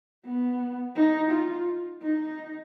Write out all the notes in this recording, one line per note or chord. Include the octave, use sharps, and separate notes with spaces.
B3
D#4
F4
D#4